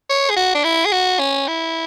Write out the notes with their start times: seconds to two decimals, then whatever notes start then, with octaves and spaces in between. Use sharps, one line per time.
0.10 C#5
0.30 G#4
0.37 F#4
0.55 D4
0.64 E4
0.85 G#4
0.92 F#4
1.19 C#4
1.48 E4